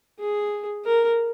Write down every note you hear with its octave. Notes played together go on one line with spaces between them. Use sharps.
G#4
A#4